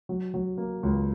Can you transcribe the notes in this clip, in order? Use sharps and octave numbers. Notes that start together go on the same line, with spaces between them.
F#3
F#3
A#3
C#2